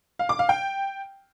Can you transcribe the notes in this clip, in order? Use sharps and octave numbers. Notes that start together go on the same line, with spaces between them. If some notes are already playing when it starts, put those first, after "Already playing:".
F5
D6
F5
G5